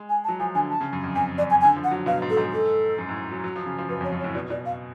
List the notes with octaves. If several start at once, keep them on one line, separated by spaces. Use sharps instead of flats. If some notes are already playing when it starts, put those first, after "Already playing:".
Already playing: G#3
G#5
A5
F#3
F3 G#5
D3 G#5
A5
C#3
F#2
F2
F2 G#5
F#2 D5
G#5
G#5
D3
F3
F#5
F#3
B2 F5
G#2
A4
G#2
A4
F#2
A2
F#3
F#3
F3
C#3
F3
F#2 B4
F2
C#5
F#2
C#5
A2
B2 D5
B2 D5
F5